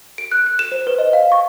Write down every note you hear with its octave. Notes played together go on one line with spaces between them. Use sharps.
D7
F#6
F#6
E7
C5
B4
D#5
F5
C#6